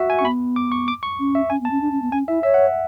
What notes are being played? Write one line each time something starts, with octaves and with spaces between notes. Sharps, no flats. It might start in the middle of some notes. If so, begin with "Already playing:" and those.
Already playing: F#4 E5
G#5
C#4 C#6
B3 B5
D6
C#6
D6
C#6
C#4
E5
C#4 G#5
B3
A5
C#4
D4
C#4
B3
C#4 G#5
E4 E5
C#5 E5
F#5